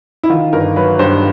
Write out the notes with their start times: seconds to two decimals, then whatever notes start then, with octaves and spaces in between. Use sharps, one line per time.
0.23 E4
0.30 D#3 F4
0.53 G1 A#4
0.76 F#3 B4
0.99 G2 C5